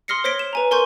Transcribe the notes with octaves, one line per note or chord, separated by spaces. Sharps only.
C6 D#6 F6 A#6 C7 C#7
C5 C#5 A#6 B6 D7 G7
E7
B4 G#5 A#5
A#4 G#5 C6 C#6 G6